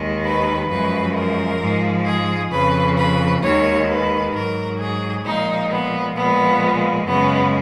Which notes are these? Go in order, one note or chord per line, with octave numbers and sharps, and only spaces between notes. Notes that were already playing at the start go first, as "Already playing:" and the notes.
Already playing: D#2 D#3 G#3
B4
F#2 F3 G#3 B4
A#4
G#2 F3 G#3
G#4
F2 C#3 F3 B4
B4
D#2 D#3 G#3 C#5
B4
G#2 F#3 A#4
G#4
A#2 F3 G#3 D#4
B3
A#2 F3 G#3 B3
F#2 C#3 G#3 B3